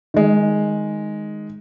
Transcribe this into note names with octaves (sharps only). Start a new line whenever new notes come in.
D#3 G#3